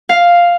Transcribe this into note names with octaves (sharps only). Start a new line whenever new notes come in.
F5